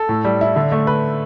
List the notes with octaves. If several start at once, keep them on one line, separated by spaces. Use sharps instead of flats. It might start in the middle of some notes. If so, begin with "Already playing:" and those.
Already playing: A4
A2
G3
E4
D3
A3
B4